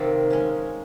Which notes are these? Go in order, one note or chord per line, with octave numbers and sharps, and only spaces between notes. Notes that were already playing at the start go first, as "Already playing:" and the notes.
Already playing: C3 D#3 A#3 F4
G#3 C#4